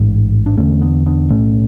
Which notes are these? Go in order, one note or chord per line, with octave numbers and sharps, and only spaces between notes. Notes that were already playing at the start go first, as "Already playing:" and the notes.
Already playing: A1 G#2 E3 G#3
D4
E1 E2 D3 A3 C#4
B3 D4
B3 D4
B1 A2 A3 C#4